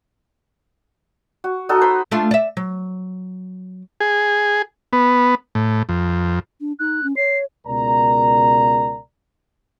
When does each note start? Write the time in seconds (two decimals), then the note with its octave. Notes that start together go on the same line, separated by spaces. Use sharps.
1.44 F#4
1.69 D#4 F#4 A4 D#5
1.81 C5 A#5 B5
2.11 A3 D4 F4
2.31 D5 E5
2.57 F#3
4.00 G#4
4.93 B3
5.55 A2
5.89 F2
6.60 D4
6.79 D#4 F#6
7.03 C#4
7.16 C#5 C7
7.67 C#2 B2 A#4 D5 A#5